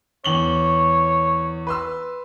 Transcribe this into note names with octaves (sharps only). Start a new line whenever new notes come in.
E2 C#5 F#7 G7
B4 C6 E6